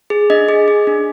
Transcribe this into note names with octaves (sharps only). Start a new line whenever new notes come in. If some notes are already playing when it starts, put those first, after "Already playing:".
G#4
D4 D#5
G#4
G#4
D4